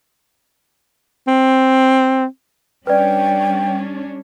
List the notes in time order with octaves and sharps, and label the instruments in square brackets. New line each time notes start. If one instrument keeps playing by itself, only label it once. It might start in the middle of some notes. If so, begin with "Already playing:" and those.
[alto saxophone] C4
[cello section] G3 C#4 D4 [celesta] B4 D5 [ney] G5